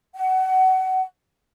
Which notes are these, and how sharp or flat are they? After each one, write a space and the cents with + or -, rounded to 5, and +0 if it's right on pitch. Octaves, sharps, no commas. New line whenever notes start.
F#5 +25